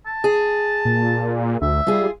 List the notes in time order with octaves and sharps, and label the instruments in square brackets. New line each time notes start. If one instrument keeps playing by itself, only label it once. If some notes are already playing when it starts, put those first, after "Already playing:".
[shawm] A5
[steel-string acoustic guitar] G#4
[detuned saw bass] A#2
[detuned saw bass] D2 [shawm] E5
[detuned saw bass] G3 [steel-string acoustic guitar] F4 G#4